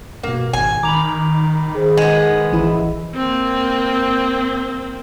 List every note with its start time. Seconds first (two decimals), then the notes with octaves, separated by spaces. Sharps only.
0.23 G2 B2 A#3
0.53 G#1 G#5
0.83 D#3 A#5 B5 D6 F7
1.75 G#4 C5
1.97 G#3 B3
2.53 A1 E3 E4
3.14 A#3 C4